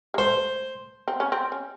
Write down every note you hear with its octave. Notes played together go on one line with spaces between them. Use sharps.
G#3
A3 C5
C4
C#4
C4
C#4